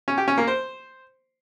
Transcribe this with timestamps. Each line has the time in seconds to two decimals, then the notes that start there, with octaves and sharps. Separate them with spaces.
0.08 C#4
0.18 G4
0.28 C#4
0.38 A#3
0.47 C5